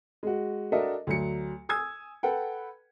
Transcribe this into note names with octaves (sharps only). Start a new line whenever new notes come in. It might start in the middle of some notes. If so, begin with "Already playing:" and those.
G#3 F#4
D4 F#4 A4 A#4 D#5 E5
D2 F#3 C#7
G#5 D#6 E6 G#6
A4 B4 F#5 G5